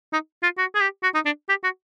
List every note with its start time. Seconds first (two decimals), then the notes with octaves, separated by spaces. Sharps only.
0.13 D#4
0.43 F4
0.58 F#4
0.75 G#4
0.81 G4
1.03 F#4
1.15 D#4
1.26 D4
1.49 G4
1.64 F#4